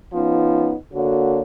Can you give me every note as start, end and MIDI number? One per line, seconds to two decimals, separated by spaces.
0.14 0.73 53
0.14 0.73 59
0.14 0.73 61
0.14 0.73 63
0.94 1.42 50
0.94 1.42 58
0.94 1.42 66
0.94 1.42 69
0.94 1.42 73